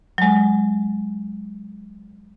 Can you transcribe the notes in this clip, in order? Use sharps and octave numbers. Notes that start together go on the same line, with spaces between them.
F#3 G#3